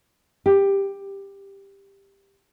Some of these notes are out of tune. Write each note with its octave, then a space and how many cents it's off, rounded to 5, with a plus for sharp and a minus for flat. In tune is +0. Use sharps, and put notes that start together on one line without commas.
G4 +10